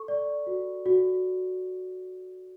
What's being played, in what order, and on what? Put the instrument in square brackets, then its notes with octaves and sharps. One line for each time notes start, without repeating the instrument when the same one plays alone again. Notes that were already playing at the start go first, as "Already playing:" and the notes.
Already playing: [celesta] A4 C#6
D5
F#4
F#4